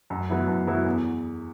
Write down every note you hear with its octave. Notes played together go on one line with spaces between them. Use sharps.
F#2
F#3 B3 E4
F#2
F#3 B3 E4
E2